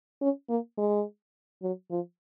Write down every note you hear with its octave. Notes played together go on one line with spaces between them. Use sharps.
C#4
A#3
G#3
F#3
F3